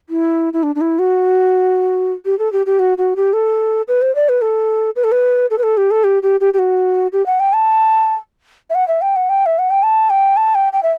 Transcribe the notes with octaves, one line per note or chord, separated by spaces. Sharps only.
E4
E4
D4
D4
E4
F#4
G4
A4
G4
G4
F#4
F#4
G4
A4
B4
C5
D5
B4
A4
B4
A4
B4
A4
B4
A4
G4
A4
G4
G4
G4
G4
F#4
G4
F#5
G5
A5
E5
F#5
E5
G5
F#5
G5
E5
F#5
G5
A5
G5
A5
G5
G5
E5